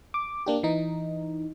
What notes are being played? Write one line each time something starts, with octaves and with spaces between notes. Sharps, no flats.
D6
A#3 D4 G4
E3 D#4